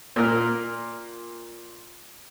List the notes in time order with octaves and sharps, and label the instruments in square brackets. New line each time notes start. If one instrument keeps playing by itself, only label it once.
[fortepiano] A#2 A#4 F6